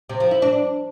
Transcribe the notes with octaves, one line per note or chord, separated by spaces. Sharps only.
C3
F3
E4
D4